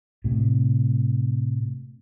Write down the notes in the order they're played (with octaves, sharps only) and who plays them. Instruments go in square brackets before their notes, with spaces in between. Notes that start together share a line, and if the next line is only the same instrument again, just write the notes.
[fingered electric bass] A2 C3